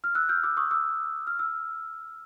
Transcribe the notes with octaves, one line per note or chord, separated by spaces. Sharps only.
F6
E6 F#6
F6 G6
D6 E6
C#6 D#6
D6 E6
F6
E6